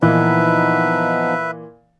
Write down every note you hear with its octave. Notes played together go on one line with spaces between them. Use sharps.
A#2 E3 F3 B3 D#4 B4 E5